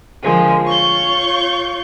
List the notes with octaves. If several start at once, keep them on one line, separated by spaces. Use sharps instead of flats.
D3 F3 G#3 A#3
F4 C#5 C#6 G6